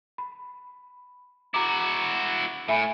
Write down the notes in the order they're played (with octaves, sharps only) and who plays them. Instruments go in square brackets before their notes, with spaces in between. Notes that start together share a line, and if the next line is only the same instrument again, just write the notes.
[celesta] B5
[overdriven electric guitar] E4 F#4 [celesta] A#5 D6
[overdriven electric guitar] A2 [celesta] E5 G#5 B5